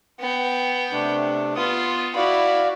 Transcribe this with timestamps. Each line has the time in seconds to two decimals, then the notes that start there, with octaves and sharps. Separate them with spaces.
0.20 B3 G5
0.92 C3 A3 D4
1.56 B3 F4 D#6
2.16 E4 F#4 D5 F5 B5